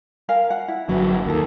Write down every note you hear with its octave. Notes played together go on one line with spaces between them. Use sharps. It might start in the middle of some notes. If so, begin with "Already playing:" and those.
A#4 F5 G#5
F#5
E4
G1 F#3 F#4 B4 F#5
D#2 A4 A#4